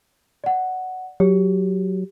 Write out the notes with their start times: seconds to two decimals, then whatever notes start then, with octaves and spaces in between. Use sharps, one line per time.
0.44 D5 F#5
1.20 F#3 G4